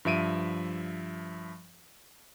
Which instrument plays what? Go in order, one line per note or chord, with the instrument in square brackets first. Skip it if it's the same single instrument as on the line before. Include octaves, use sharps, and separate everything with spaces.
[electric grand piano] G2 F3 E5 D7 D#7